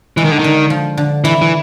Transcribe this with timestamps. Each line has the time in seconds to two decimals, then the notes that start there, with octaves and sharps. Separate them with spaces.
0.17 E3 G#3
0.24 D#3
0.31 D3
0.39 D#3
0.44 D3
0.70 F3
0.97 D3
1.24 E3 E4
1.42 E3